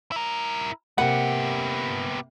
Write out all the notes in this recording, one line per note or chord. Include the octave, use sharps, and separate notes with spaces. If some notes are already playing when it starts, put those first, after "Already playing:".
E4 A#4
C3 A#3 B3 G4 F#5